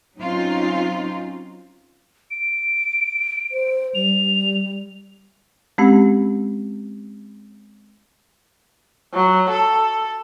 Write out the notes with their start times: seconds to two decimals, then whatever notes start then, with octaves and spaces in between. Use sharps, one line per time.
0.17 F#3 C4 C#4 D#4 F4
2.31 D7
3.52 C5
3.95 G3 F7
5.78 G#3 C4 C#4 G4
9.14 F#3
9.50 A4